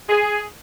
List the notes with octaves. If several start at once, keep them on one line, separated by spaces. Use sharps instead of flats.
G#4